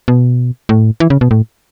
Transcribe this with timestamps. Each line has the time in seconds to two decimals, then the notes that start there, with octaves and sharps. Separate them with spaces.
0.08 B2
0.69 A2
1.00 E3
1.10 C#3
1.21 B2
1.31 A2